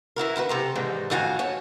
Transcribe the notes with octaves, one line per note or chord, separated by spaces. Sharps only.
E3 E4 F#4 A#4
D#3 E4 F#4 B4
C3 A4 A#5
G#2 D#3 E3 G3 G#3
F2 A2 D#3 F#4 F5 G#5
C#5 A5